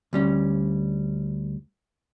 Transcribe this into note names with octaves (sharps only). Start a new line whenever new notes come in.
D2 G3 C#4